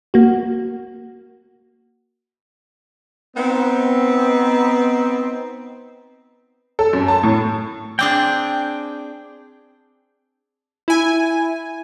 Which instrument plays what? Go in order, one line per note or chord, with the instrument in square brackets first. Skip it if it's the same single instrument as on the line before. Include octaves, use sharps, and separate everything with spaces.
[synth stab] A#3 F#4
[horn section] B3 C4 D#4
[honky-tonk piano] A4
F#2
A5
A2
[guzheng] C4 D4 G#4 [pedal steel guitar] G5
[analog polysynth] E4 G#5